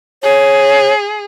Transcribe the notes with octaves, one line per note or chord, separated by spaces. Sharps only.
G#4 C#5